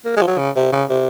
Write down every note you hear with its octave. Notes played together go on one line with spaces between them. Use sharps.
A#3
G#3
F3
F#3
C#3
C3
C#3
C3